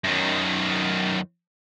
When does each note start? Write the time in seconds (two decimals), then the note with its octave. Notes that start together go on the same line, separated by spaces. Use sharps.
0.04 F#2 D#3